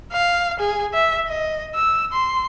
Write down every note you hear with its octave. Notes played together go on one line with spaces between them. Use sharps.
F5
G#4
E5
D#5
E6
C6